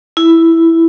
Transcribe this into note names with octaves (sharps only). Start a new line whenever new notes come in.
E4